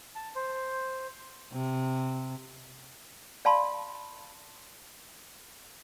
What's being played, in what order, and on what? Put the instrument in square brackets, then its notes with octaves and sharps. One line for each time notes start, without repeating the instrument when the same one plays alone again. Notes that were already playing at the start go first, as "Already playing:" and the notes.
[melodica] A5
C5
[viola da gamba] C3
[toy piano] D5 F5 A5 B5 C6